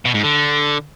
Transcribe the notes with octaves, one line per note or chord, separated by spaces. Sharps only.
B2
G#2
D3